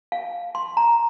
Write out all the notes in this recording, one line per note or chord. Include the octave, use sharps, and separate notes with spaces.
F5
C6
A#5